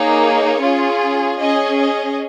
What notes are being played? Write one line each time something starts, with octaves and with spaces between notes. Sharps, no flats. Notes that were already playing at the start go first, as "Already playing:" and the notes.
Already playing: A#3 D#4 G#4 C#5
C#4 F4 G#4
C#4 G#4 D#5
D#5